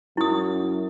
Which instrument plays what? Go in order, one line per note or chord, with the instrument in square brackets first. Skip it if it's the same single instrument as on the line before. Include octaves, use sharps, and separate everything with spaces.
[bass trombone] F#2 [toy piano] E4 D#6